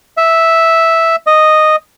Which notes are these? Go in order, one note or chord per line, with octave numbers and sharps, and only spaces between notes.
E5
D#5